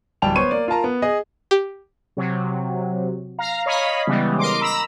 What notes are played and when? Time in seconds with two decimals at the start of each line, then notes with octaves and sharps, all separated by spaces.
0.22 D1 G3 G5 A5 F7
0.36 B3 C5 C#5 C#6 D#7
0.51 A#3 D5
0.68 F4 A#4 A5 A#5
0.84 B3
1.02 G#4 D#5
1.51 G4
2.17 C3 F#3
3.38 F5 A#5
3.66 C#5 D#5 F5 B5
4.07 C#3 E3 G3 G#3 B3
4.39 A#4 D#5 C6 D6
4.61 A#5 B5 E6